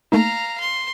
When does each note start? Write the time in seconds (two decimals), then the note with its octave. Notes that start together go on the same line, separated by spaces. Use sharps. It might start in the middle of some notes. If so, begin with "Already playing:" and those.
0.12 A3 A#3 D#4 F5 A#5
0.60 C6